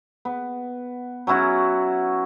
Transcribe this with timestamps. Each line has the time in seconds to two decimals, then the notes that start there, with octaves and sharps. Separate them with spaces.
0.25 B3
1.27 F#3 C#4 E4 F#4